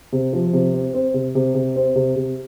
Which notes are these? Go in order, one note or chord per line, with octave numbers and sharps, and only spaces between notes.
C3
F3
C3
C4
C4
C3
C3
C3
C4
C3
C3